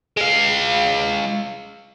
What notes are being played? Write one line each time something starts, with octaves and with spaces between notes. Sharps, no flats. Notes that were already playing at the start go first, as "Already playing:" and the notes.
G#3 F5